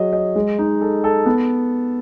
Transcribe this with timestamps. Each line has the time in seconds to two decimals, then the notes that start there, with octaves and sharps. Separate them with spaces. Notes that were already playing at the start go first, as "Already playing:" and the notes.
Already playing: F#3 G#4 D#5
0.13 D#5
0.35 G#3
0.59 D#4
0.81 A4
1.04 A4
1.26 B3